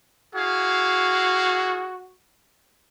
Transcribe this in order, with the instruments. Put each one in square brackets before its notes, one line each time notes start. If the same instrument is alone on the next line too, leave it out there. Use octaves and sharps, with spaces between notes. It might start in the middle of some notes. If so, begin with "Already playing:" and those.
[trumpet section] E4 G#4 F5 [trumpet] F#4